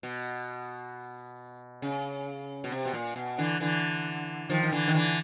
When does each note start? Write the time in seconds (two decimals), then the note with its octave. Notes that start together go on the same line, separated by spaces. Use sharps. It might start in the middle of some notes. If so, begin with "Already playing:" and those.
0.03 B2
1.82 C#3
2.64 B2
2.72 C3
2.85 B2
2.94 A#2
3.16 B2
3.38 D3 E3
3.60 D3 E3
4.50 D#3 F3
4.63 D#3
4.72 D3 E3
4.88 D#3
4.95 D3 E3